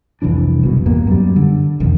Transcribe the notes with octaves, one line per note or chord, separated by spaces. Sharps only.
F1 C2 E3 D4
F#1 B2
E2 G2 A#3 B3
F#2 G3
D3
E1 C2 F2 D#3